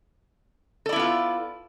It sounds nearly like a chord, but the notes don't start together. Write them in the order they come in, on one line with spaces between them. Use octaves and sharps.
A4 D5 E4 B3 F4